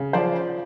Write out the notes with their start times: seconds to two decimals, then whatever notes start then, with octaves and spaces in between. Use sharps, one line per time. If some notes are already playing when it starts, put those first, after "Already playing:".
Already playing: C#3
0.13 F3 C5 D5